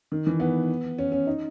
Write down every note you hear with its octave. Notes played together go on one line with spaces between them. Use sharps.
D#3
E3
B3
C#4
C#4
D#4